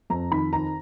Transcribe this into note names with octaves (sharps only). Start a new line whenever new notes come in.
F2 A#5
D#3 B5
D#3 A#5